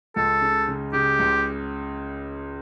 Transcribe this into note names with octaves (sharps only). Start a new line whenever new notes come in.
C#2 A4
C#3
C#3
C#3 G4
C#2